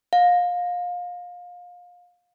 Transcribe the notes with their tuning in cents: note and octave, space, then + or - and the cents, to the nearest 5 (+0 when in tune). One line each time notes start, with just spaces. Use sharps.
F5 +25